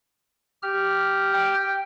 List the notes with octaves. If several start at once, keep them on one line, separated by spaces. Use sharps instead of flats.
G4 F6
G5